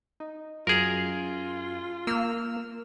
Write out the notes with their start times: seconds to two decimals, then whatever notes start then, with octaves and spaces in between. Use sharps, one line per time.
0.20 D#4
0.67 F#2 F4 G#4 A#4
2.07 A#3 E6 F6